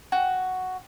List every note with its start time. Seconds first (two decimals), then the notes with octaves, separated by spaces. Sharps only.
0.12 F#4